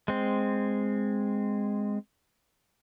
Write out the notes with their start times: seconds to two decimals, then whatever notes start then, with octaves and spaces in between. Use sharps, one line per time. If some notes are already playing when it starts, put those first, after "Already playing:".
0.08 G#3 C4